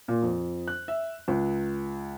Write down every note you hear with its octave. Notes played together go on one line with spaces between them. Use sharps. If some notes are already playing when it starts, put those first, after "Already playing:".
A#2
F2
F#6
E5
C#2